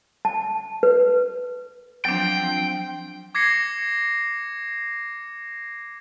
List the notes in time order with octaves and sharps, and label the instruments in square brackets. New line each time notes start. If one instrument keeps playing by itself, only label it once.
[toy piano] A5
B4
[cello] F3 C4 [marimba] F#3 D4 [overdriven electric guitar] G5
[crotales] D6 G#6 A#6 C7 C#7